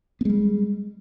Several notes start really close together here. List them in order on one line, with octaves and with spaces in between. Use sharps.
B3 G#3 G3